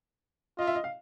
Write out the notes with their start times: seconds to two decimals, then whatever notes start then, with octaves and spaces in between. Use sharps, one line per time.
0.58 F4 D#5
0.67 E5
0.75 D#5
0.84 F5